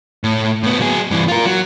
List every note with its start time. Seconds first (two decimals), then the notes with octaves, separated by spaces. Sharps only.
0.24 A2
0.63 A2 B3
0.80 F#3 G#4
1.11 G2 E3
1.28 F4 A#4
1.46 F#3